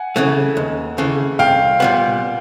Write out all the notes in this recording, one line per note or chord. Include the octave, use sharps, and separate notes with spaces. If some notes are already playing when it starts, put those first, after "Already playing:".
Already playing: F#5 G#5
C#3 E3 A3
D#2
C#3 E3 A3
C2 F5 G5
A#2 G3 B3